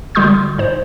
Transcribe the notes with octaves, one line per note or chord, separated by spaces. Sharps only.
D3 G3 F#4 C6 D#6 G6
G#2 C5